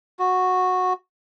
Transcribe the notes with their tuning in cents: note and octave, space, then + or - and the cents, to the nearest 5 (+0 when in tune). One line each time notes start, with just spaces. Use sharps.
F#4 -10